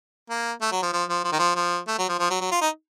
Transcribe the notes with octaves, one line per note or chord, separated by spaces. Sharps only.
A#3
A3
F#3
F3
F3
F3
F3
D#3
F3
F3
A3
F#3
F3
F3
F#3
F#3
F4
D#4